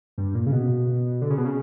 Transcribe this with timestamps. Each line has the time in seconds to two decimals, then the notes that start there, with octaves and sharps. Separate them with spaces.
0.18 G2
0.35 A#2
0.46 C#3
0.52 B2
1.22 D3
1.30 C#3
1.38 B2
1.45 C#3